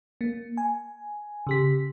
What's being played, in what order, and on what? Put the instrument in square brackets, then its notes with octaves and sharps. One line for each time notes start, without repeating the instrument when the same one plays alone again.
[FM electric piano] A#3
G#5
C#3 G4 B6